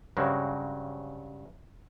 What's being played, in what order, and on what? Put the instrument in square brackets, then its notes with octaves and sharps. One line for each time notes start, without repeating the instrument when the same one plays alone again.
[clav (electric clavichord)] G2 C#3 F#3 G#3 C4